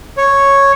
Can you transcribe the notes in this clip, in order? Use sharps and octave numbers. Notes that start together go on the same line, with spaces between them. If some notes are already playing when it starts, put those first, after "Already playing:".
C#5